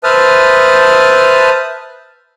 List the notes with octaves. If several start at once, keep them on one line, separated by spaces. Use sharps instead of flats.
B4 C5 E5 A5 D#6 F6